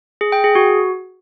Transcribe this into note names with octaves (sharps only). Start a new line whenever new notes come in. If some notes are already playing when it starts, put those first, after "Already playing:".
G#4
G5
G#4
F#4